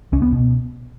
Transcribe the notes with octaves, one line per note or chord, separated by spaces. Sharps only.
C#2 C#4
B3
B2